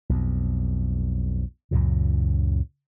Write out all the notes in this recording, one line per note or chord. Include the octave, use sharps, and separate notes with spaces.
B1 F2
C#2 F#2 A#2 C#3